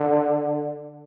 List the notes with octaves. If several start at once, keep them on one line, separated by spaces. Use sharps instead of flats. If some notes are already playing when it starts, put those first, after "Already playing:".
Already playing: D3